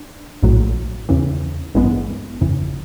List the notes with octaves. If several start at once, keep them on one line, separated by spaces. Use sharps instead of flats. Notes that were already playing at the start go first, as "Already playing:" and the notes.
Already playing: D4
A#1 A2 F#3
E2 C#3 E3
A1 G2 E3 G#3 B3
G1 F2 C#3 E3